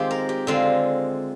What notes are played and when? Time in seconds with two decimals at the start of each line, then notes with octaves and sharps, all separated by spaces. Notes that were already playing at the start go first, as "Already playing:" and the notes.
Already playing: D#3 G#3 C4 F4 G4
0.11 A#4
0.29 G4
0.47 D3 G#3 C4 F4